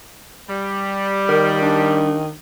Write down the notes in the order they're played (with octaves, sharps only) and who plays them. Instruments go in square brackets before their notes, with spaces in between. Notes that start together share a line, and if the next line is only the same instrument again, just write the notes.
[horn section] G3
[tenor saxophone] D#3 [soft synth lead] A#4
[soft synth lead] D4